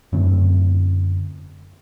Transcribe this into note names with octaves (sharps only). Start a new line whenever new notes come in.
F#2 D3 A3 C4